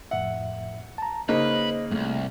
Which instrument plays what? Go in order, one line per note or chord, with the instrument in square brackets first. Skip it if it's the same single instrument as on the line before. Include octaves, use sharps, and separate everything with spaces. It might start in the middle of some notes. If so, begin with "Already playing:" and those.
[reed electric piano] F2 A2 E5 [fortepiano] F#5
[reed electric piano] A5 A#5
[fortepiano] C#3 A#3 D#4 [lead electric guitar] B4 [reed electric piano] C5 D#5
[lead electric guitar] C2 F#2 [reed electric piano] A3